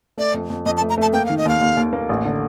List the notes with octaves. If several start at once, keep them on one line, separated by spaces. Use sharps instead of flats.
A3 D5
F2
F2
F2 D#5
A5
A3
A#5
A3 A5
A#3 G5
D#3 F5
D#5
D#2 F5
D#2
D#2
A#3
A1
D3